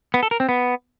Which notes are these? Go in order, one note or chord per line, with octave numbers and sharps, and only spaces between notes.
B3
A4
A#4
C4
B3